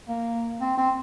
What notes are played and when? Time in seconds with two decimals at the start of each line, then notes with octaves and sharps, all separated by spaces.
0.08 A#3
0.61 C4
0.77 C4